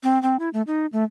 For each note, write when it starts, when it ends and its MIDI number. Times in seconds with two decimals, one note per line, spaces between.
0.03 0.21 60
0.23 0.37 60
0.40 0.49 64
0.53 0.62 57
0.67 0.86 63
0.93 1.04 57